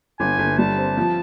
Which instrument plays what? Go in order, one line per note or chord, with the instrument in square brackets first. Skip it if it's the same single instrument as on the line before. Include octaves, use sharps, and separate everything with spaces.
[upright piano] G1 [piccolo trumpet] G#5
[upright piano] G1
[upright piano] G3 [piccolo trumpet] A5
[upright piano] C4
F3